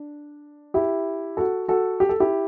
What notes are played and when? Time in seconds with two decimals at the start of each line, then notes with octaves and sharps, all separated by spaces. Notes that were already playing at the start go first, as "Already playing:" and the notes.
Already playing: D4
0.74 E4 G4
1.37 F#4 A4
1.68 F#4 A4
2.00 G4
2.09 A4
2.20 E4 G4